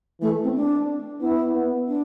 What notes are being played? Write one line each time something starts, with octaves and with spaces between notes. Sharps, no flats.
E3 A3
C4
D4
B3 E4
B3
D4